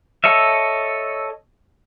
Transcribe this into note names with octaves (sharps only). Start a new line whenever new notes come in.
A4 C#5 D#5 E5